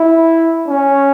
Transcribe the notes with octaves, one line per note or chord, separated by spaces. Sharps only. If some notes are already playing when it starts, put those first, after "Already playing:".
Already playing: E4
C#4